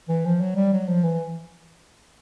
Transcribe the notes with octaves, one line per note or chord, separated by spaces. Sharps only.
E3
F3
F#3
G3
F#3
F3
E3